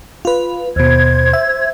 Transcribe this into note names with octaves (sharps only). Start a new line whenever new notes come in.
F4 B4
D#2 B2 C5 G#6
E5